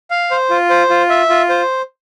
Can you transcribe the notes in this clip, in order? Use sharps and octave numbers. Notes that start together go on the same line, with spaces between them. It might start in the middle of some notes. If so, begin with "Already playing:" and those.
F5
C5
F4
C5
F4
E5
F4
C5